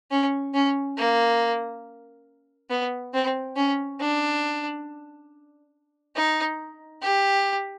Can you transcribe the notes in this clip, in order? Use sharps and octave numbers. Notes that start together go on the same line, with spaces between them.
C#4
C#4
A#3
B3
C4
C#4
D4
D#4
G4